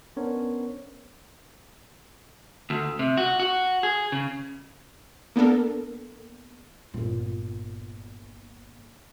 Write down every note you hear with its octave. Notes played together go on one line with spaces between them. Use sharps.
B3 C#4 D4 A#4 C5 C#5
D2
C3
F#4
F#4
G#4
C#3
A#3 B3 D4 A4 A#4
G1 A#2